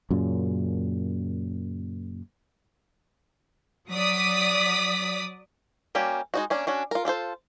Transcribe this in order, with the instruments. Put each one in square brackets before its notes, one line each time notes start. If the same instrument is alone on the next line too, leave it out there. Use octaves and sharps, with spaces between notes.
[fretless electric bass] F#2 A#2 C#3
[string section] F#3 D5 D#6 B6
[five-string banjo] G3 A#3 C#4 F#4 G4
G#3 D#4 F#4
A#3 C#4 D4
C#4 D4 F#4
F4 A#4
D4 F4 A4 C5